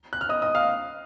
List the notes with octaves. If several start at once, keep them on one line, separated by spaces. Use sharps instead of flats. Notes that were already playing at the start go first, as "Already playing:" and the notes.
F#6
F6
D#5 D#6
D#5 D#6
F5 F6